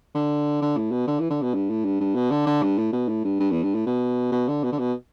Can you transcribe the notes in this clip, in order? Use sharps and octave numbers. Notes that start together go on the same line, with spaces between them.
D3
D3
A2
B2
D3
E3
D3
B2
G2
A2
G2
G2
B2
D3
D3
G2
A2
B2
A2
G2
G2
E2
G2
A2
B2
B2
D3
B2
D3
B2